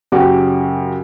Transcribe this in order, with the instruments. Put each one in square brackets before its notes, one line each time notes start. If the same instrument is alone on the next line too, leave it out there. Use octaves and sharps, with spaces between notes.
[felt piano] F#2 C#3 C#4 F#4 G4 D6